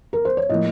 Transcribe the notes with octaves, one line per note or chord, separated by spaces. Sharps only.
A#4
C5
C#5
A2 F3 A#3 D#5